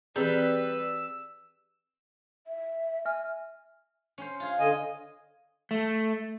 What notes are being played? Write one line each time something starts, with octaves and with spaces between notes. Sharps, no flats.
E3 G3 C4 G#4 B4 E6
E5
E5 G#5 F6
C#4 C5
F4 G#4
D3 D#5 G#5
A3